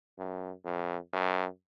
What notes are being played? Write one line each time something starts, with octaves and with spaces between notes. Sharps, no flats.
F#2
F2
F#2